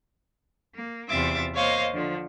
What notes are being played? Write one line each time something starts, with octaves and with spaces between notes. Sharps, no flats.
A#3
E2 C3 F4 E5 D6 A6
A#3 C5 C#5 D#5 F5
D3 F3